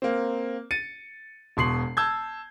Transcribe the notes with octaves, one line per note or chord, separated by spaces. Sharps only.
A#3 C4
A6 C#7 D#7
E1 B2 C6 C7 F#7
A5 E6 G6 G#6